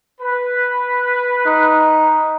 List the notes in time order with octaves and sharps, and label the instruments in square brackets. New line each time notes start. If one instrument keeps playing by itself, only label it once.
[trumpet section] B4
[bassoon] D#4